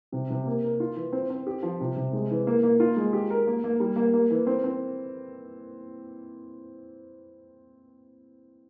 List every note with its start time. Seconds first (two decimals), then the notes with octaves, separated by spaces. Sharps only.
0.12 C3
0.30 C3
0.46 A#3
0.63 A#4
0.80 F4
0.96 E3
1.13 C4
1.30 C4
1.47 G4
1.63 F3
1.80 C3
1.96 C3
2.13 G#3
2.30 E3
2.47 A#3
2.63 A#3
2.80 F4
2.97 G#3
3.13 G4
3.30 A#4
3.47 A#3
3.64 A#3
3.80 G3
3.96 A#3
4.14 A#3
4.30 E3
4.47 C4
4.64 C4